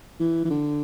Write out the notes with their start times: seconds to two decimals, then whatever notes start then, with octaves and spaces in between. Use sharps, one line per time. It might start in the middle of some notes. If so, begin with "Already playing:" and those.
0.20 E3
0.45 E3
0.50 D3